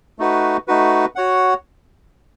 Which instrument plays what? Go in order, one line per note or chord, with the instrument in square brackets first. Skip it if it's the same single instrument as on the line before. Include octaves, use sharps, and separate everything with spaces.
[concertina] A3 D#4 F#4 B4
A3 D#4 F#4 B4
F#4 C#5 F#5